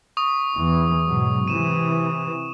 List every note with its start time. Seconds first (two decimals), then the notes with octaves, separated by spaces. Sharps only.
0.17 C#6 D#6
0.56 E2 E3
1.08 G#2 B2 F#3
1.48 C3 E3 D#7 E7